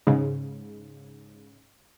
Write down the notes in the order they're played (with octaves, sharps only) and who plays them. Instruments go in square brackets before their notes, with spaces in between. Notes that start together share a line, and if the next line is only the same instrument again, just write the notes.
[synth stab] G#2 C#3